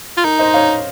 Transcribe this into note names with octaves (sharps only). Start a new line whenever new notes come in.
F4
D#4 A#4
C5 D#5
C#5 F5